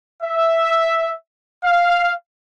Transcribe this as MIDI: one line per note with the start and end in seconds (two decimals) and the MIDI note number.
0.23 1.14 76
1.64 2.13 77